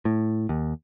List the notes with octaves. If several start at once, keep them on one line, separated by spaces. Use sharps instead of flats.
A2
D#2